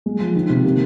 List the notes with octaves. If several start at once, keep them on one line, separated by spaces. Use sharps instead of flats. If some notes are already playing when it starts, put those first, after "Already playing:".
G#3
F3
D#3
C3
A#3